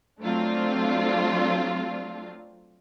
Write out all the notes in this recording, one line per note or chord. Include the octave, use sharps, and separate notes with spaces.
F#3 A3 C4 D4 F4